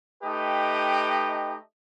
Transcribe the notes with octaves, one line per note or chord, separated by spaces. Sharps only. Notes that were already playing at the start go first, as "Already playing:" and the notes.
A3 D#4 G4 B4 D#5 G5